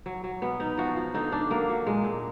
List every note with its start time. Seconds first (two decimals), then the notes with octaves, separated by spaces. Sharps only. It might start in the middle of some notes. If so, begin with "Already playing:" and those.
0.06 F#3
0.24 F#3
0.42 B2 B3
0.60 B2 D#4
0.77 F3 F#4
0.96 F3
1.14 D3 D#4
1.32 D3 D4
1.51 F#3 A#3
1.69 F#3
1.86 A#2 G#3
2.04 A#2